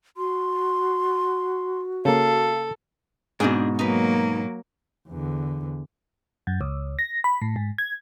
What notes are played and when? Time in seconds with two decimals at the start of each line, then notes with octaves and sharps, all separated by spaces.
0.17 F#4 C6
2.05 C#3 A#3 A4 F5
3.40 G#2 B2 C4 D4 G#4
3.79 F#3 A#3 D#4 B4
5.09 E2 D3
6.47 F#2
6.61 C#2
6.99 A#6
7.24 B5
7.42 A2
7.56 G#2
7.78 G#6